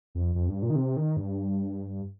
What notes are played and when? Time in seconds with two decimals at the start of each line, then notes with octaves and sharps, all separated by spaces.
0.15 F2
0.35 F2
0.49 G2
0.62 A#2
0.70 D#3
0.76 C3
0.97 D#3
1.17 G2